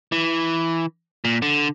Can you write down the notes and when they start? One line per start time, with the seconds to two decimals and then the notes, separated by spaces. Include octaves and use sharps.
0.12 E3
1.25 A#2
1.42 D3